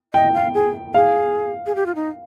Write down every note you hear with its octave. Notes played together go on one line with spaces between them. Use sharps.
D#5 G5
F5
G#4
G#4 F5
G#4
G4
F4
D#4